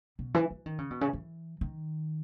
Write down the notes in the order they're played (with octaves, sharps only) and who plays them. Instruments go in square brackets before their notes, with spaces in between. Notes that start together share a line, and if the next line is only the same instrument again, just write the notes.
[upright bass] B2
E3
E3
D#3
C#3
B2
C#3
E3
D#3